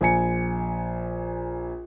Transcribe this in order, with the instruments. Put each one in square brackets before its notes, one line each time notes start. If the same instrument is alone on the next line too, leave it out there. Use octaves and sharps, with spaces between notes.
[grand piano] A#1 G#5 C#7